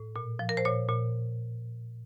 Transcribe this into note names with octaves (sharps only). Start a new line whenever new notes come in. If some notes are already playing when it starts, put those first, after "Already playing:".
Already playing: A2
A#2
F3
A#4
C5
A#2 C#5
A#2